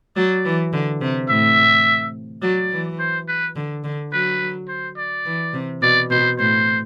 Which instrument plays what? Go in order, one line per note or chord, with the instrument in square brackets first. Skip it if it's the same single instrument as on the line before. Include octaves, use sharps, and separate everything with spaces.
[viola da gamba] F#3 [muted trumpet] D5
[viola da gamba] E3
D3
C3
[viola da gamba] A2 [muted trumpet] E5
[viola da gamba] F#3 [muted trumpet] D5
[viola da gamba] E3
[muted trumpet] C5
B4
[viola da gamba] D3
D3
[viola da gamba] F#3 [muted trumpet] B4
[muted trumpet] C5
D5
[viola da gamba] E3
C3
[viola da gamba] B2 [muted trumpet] D5
[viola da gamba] B2 [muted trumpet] C5
[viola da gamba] A2 [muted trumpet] C5